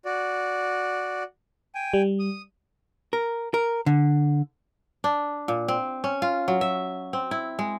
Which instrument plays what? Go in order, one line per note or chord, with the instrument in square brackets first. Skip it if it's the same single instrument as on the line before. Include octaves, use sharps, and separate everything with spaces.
[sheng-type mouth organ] F#4 D5
G5 G#5
[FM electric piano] G3
[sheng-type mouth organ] D#6
[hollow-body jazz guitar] A#4
A#4
D3
[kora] D4
A#2
C4
C#4
F4
F#3
E5
C4
E4
G#3